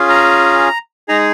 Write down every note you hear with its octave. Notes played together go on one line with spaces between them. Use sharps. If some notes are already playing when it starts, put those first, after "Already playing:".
Already playing: C#4 F4 G#4
A#5
G#3 D#4 G#4 A#5